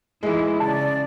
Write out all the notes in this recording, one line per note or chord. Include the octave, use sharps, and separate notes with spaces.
E3 G#3 D#4 E4
C#3 D5 A5